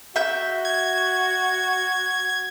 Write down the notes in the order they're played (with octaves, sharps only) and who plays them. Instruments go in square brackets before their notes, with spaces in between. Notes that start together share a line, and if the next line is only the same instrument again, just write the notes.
[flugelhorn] F#4 [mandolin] E5 G6
[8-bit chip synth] G#6